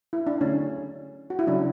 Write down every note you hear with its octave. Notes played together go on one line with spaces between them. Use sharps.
E4
D4
D3 F#3 A3 C#4
F#4
E4
C#3 F#3 C#4 D4